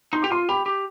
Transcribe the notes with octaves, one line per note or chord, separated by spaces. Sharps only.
D#4 C6
G4 D6
F4 C6
G4 B5
G4